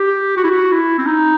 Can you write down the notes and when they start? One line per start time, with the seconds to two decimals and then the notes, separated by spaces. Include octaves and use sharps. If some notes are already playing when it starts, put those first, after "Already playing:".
Already playing: G4
0.37 F#4
0.44 E4
0.51 F#4
0.72 E4
0.99 C4
1.06 D#4